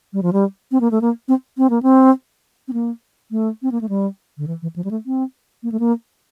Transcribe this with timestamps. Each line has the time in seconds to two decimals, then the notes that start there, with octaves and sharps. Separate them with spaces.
0.13 G3
0.23 F3
0.33 G3
0.72 C4
0.81 A#3
0.91 A3
1.01 A#3
1.28 C4
1.58 C4
1.70 A#3
1.83 C4
2.68 C4
2.73 A#3
3.31 A3
3.62 C4
3.72 A#3
3.81 A3
3.89 G3
4.38 D3
4.47 E3
4.62 E3
4.76 F3
4.85 G3
4.91 A3
5.06 C4
5.63 A#3
5.72 A3
5.80 A#3